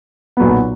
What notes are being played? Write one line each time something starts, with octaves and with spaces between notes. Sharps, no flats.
B1 A#2 F#3 B3